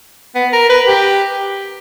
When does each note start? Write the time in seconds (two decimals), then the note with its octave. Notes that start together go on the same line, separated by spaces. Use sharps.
0.35 B3
0.53 A#4
0.70 B4
0.87 G4